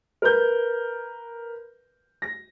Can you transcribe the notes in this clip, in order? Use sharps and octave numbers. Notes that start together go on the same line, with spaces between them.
A#4 B4 G6
A#6